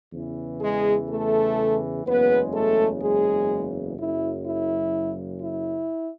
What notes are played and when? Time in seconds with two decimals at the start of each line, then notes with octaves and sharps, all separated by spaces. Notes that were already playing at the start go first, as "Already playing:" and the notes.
0.13 E2 C#3 E3
0.61 G#3 G#4
1.09 A3 A4
2.05 F#1 E2 C#3 G#3 B3 B4
2.53 A3 A4
3.01 G#3 G#4
3.98 F#1 F#2 C#3 E4
4.46 E4
5.42 E4